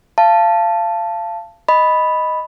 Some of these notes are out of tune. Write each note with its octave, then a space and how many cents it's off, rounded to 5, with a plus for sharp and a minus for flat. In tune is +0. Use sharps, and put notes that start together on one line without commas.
F5 -30 A5 +0
D#5 +0 B5 +0